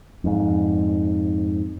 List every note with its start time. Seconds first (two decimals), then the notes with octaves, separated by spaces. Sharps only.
0.24 F2 G#2